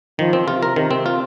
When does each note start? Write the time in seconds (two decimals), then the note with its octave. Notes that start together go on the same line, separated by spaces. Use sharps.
0.19 D#3 F3
0.33 C4
0.47 C3 F4
0.63 A#4
0.76 C3 D#3
0.91 C4
1.06 F4